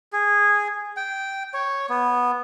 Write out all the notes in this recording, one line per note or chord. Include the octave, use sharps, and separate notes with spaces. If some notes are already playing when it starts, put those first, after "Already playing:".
G#4
G5
C#5
B3